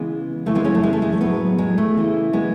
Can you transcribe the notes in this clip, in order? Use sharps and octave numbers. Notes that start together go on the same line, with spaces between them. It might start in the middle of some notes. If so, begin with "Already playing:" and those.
Already playing: C#3 E3 G#3 B3
C#3 E3 A3
G#3 B3
A3 C#4
A3
G#3
A3
G#3
A3
A2 F#3 G#3 B3
G#3
A3
C#3 E3
G#3 B3